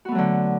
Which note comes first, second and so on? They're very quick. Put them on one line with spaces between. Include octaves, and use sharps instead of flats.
F#4 B3 A3 F#3 D3